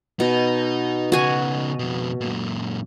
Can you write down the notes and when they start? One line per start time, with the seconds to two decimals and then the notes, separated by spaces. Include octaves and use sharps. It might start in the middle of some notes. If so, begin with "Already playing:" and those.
0.20 B2 D#4
1.12 C#3 D#4 F#4 G#5
1.79 F2 B2
2.21 F#2 A#2